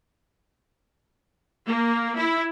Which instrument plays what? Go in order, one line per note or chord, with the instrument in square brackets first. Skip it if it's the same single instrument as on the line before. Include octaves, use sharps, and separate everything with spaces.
[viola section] A#3
E4